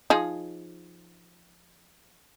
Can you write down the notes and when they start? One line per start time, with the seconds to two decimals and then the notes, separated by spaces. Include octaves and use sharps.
0.10 F3 D#4 G#4